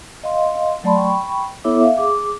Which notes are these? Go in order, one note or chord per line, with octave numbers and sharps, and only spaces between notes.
D#5 F5 C6
F#3 A3 D5 A5 B5 C6
G5 B5 C#6
B3 E4 A4 C#5 E5 D6
E5 F5
G#4 D6